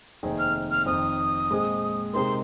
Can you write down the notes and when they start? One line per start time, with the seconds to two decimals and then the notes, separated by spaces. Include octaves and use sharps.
0.23 F1 D#2 D#3 C4 G#4
0.39 F6
0.71 F6
0.86 F2 D#3 C4 D#6
1.50 A#2 G#3 C4 G#4
2.14 C3 G#3 C4 D#4 A#4 C6